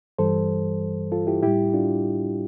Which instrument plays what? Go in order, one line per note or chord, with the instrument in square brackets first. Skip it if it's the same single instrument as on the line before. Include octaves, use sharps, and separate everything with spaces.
[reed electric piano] G2 E3 G3 A4 C5
F4 A4
E4 G4
A2 G3 E4 G4
D4 F4